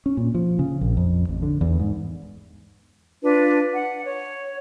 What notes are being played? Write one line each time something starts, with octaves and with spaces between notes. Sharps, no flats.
C#4
A#2
F3
C#3
A#1
F2
A1
D3
E2
G#2
D4 F4 B4
F#5
C#5